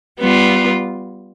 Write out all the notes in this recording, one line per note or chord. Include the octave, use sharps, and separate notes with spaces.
G3 B3 F4